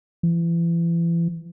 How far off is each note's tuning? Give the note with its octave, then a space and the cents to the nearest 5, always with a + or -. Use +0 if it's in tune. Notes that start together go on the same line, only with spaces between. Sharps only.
E3 +35